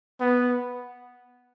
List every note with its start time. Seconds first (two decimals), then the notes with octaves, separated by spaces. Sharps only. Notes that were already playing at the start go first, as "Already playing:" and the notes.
0.20 B3